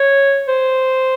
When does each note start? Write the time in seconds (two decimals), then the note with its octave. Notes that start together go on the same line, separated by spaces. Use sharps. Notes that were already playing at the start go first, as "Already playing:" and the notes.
Already playing: C#5
0.48 C5